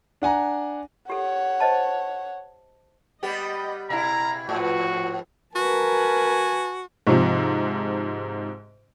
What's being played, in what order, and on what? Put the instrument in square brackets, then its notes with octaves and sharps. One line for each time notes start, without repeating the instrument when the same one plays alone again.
[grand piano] D4 F#5 G#5 A#5
[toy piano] G4 A4 [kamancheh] C#5 F#5
[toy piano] C5 D#5 A5
[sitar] G3 B3 G4 [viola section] D#5
[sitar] B2 E4 [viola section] F5 [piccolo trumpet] A#5
[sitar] G#2 [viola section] F3 B4 [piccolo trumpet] F#4
[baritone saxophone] F#4 [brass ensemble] A#4 [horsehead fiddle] B4 A5 [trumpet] G#5
[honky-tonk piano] G#2 C3 F3